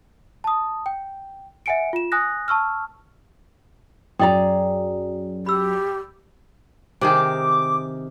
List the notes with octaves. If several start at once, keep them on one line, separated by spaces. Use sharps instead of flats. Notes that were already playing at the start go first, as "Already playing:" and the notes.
A5 D#6
G5
E5 F#5 G#5 C#7 D7
F4 E7
G#5 D#6 F#6 A#6
A5 C#6 E6 F6
F#2 G#4 D5 G5 A#5
G4 B5 E6
C3 D#3 G#4 D6